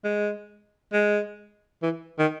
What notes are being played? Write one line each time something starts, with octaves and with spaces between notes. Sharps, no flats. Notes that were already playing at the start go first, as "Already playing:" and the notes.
G#3
G#3
E3
D#3